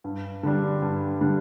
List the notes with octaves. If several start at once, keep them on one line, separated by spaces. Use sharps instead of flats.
G2
D3 G3 D4
G2
D3 G3 D4